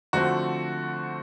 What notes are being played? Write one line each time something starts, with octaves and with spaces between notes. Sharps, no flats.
D3 F3 A3 C4 F#4